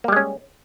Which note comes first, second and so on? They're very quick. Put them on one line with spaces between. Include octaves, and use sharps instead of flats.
A#3 G3 G#3 C#4